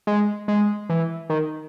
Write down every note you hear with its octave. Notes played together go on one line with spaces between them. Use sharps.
G#3
G#3
E3
D#3